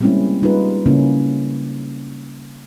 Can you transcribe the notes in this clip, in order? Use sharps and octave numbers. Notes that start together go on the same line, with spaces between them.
G3 G#3 A#3 C4 C#4 E4
G3 D#4 F4 G#4 B4
C#3 A#3 C#4 E4